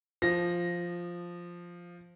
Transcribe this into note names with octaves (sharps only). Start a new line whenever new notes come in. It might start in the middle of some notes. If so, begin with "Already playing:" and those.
F3 A#6